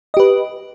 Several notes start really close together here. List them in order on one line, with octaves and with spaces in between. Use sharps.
D#5 G4 B4